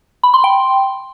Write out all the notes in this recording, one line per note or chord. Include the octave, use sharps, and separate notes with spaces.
B5
C6
G5